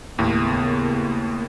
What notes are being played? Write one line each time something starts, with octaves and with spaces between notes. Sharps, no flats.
D#2 A2 C#3 A#3 B3